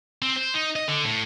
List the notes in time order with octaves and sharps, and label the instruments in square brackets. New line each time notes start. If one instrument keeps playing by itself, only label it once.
[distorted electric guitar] C4
C5
D#4
D#5
D3
A2